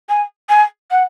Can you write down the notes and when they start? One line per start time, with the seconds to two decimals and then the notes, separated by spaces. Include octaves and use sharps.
0.09 G#5
0.49 G#5
0.91 F#5